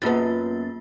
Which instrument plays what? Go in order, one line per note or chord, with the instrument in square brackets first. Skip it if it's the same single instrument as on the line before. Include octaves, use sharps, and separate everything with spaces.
[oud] F#2 B3 [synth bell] A#3 F4 A6